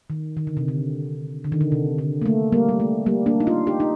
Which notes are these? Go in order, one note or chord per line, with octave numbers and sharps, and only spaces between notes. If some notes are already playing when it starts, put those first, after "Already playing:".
D#3
D#3
D3
C3
D3
D3
D#3
D3
C3
D3
A#3
A3
G3 A#3
G3
A3
G3 A#3
A#3 D4
D#4
D4 F4
D#4 G4
D#4